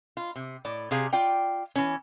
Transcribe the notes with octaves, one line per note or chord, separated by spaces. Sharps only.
F4
C3
A2 D5
C3 G4 G#4 F5
F4 D5 G5
E3 C#4